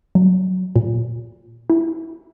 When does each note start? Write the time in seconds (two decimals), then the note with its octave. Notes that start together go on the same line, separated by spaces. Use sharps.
0.15 F#3
0.76 A#2
1.70 E4